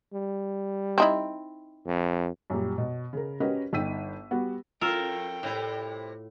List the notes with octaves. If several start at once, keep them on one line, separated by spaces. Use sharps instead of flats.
G3
C4 D#4 E4
F2
F#2 A#2 G3
B2
C#3 A#4
C#4 F#4 G4 A#4 B4 D#5
G1 D#4 G5 E6 B6 D#7
G3 B3 F#4
F2 F4 A4 A#4 G5 E6
A2 C3 G3 E4